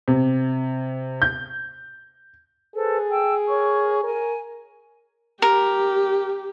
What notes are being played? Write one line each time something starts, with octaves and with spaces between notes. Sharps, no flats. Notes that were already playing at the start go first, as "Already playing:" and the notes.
C3
G6
G#4 A4 B4 C5
G5 A5 E6
A#4 C#5 C#6
A#4 G#5
G4 A#4